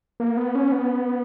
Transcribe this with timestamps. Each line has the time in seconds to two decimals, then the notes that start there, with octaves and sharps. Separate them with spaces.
0.20 A#3
0.37 B3
0.55 C#4
0.72 B3